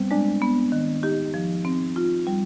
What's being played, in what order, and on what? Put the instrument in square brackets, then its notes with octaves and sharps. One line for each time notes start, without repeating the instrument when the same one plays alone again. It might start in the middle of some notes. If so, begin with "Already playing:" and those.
Already playing: [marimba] G3 [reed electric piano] B3 C4
[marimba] G#3 [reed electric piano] D4
[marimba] B3
D#3
[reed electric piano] D#4 [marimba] G4
[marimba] F3
C4
F4
G3